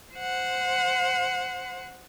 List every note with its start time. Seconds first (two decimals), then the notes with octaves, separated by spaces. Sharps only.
0.15 C5 F#5